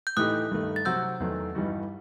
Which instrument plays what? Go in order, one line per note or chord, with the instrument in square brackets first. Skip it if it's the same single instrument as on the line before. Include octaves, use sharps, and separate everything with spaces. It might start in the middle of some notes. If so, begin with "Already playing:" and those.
[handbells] G6
[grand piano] A2 E3 A3 D#4 G4 [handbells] D#6 F#6
[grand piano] G2 D#3 A3
[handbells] A6
[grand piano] C3 F#3 C4 F#4 [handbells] E6 G6
[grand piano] E2 D#3 F#3 A3
G2 E3 G3 D#4 F#4